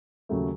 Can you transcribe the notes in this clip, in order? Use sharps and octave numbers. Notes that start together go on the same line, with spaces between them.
D#2 C#3 F#3 A3